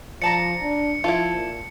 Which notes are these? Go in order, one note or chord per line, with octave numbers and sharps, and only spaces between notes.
F3 D5 A5 A#5 C#7
D4
F3 E4 F4 A4
A#2